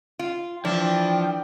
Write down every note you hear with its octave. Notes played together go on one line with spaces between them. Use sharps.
F4
E3 F3 D4 G5